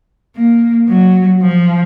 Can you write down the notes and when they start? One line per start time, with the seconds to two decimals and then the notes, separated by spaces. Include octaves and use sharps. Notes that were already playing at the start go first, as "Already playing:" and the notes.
0.36 A#3
0.89 F#3
1.42 F3